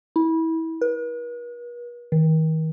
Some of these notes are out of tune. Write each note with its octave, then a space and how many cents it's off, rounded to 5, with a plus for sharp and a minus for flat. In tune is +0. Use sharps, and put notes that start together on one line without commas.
E4 -25
B4 -45
D#3 +35